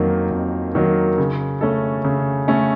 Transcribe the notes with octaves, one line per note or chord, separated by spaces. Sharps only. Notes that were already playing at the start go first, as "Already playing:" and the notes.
Already playing: F2 D#3 F#3 A#3
F2
D#3 F#3 A#3
C#3
A3 C#4 A4
C#3
A3 C#4 A4